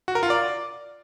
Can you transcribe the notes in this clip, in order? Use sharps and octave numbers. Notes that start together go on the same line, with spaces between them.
F#4
A#4
F4
D5